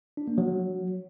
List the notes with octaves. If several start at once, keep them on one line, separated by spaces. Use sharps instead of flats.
D4
A#3
F#3